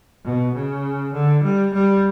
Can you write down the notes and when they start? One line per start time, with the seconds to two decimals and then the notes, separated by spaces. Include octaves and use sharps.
0.25 B2
0.54 C#3
1.13 D3
1.43 G3
1.73 G3